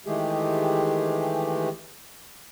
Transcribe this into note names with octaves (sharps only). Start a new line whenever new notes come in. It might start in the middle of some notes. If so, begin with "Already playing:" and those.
D#3 E3 G#3 A3 G4 G#4